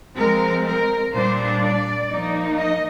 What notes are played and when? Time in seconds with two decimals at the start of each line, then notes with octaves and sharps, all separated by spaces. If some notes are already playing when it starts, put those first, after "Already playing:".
0.16 F3 G#3 C4 A#4
0.65 A#4
1.13 A#2 G3 D4 C5
1.62 D5
2.11 F3 A#3 D#4
2.59 D#5